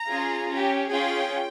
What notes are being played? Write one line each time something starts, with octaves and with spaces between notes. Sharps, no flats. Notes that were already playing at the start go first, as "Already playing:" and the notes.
Already playing: A#5
C#4 F4 G#4
C#4 G4
C#4 F4 G#4 G5